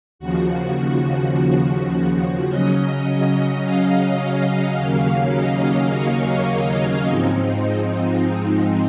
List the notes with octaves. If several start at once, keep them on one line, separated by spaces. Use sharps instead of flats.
D#2 C#3 F3 F#4
F#4
C#3 F#3 C#4 D#5
D#5
F5
D#2 C#3 F#3 A#3 C#4
D#5
C#5
G#2 F3 G#3 C4 D#4